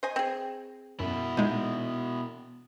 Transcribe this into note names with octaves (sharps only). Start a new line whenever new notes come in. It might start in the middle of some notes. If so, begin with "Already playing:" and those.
C5 D#5 G#5
C4 G#4
F#2 B2 E4
A#2 G#3 D#4